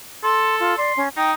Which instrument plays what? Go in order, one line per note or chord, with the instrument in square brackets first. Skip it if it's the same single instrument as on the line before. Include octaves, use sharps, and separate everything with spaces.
[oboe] A4 [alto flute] C6
[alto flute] F4
[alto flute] D5 [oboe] C6
[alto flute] C#4
[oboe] D#4 [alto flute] G5